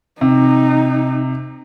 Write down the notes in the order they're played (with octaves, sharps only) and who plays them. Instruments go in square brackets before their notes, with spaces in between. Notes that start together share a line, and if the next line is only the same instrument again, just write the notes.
[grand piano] C3 [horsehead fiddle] D#4